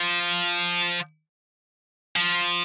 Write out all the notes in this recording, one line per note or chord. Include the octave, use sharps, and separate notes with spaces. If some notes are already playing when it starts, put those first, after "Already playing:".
Already playing: F3
F3